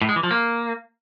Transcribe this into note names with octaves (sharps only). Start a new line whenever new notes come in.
A2
G#3
E3
F3
A#3